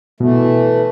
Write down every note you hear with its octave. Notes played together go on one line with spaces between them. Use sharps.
B2 E3 A3